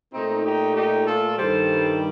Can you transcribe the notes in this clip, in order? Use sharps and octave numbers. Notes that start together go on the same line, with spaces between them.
A#2 A3 C4 D#4
D#4 G4
D#4 G4
F4 A4
G2 D#3 G3 A4 C5